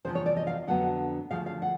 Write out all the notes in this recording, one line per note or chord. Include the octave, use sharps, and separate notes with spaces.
E2 C3 F3 C5
C#5
D5
D#5
F5
F2 D3 F#3 B3 F#5
D2 C#3 F3 F5
F5
F#5